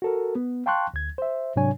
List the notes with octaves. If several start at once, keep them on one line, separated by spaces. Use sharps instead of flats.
F#4 A4 A#4
B3
F5 G5 A5 C6 C#6 F#6
D2 G#6
C5 E5
G#2 C3 F#3 D4 C#5 G#5